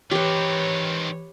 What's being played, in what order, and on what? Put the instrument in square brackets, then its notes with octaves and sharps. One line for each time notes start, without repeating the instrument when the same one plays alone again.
[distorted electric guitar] D#3 C4 [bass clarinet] E3 [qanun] G4 B4 [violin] C#5